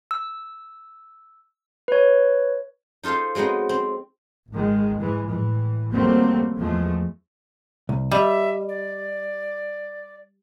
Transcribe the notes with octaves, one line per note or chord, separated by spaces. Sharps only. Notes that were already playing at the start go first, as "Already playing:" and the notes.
E6
B4 C#5
D#4 F4 A4 C5 F5
F#3 G#3 B3 C4 D#4
C4
G#1 D#3 G#3
G#2 E3 G#3
A2 E3
D#3 F#3 G3 A3 A#3 C4
E2 F3 G#3 A3
C2
G3 D#5 E5
D5